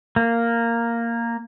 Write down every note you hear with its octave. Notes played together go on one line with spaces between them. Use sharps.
A#3